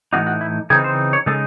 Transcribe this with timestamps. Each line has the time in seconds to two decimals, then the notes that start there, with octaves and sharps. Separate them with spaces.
0.13 A2 E3 C4 D#4 F#4
0.27 F#4
0.41 E4
0.70 C#3 E3 C4 D#4 G#4
0.84 C5
1.13 C#5
1.26 C#3 G#3 D#4 A4